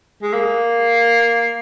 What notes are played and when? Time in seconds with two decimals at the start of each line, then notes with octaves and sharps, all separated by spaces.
0.23 G#3
0.33 A#3